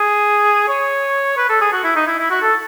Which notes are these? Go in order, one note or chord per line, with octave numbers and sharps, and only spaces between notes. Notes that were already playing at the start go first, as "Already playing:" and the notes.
Already playing: G#4
C#5
B4
A4
G#4
F#4
E4
D#4
E4
E4
F#4
A4